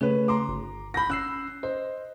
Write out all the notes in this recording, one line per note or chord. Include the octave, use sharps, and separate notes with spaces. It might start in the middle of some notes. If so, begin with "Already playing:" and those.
C#3 A3 C#4 G#4 B4
A#5 C6 D6
G1
B5 G6 A#6
C#4 E6 F#6 C7
C5 D#5